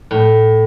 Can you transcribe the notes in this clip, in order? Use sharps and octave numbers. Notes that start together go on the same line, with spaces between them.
A2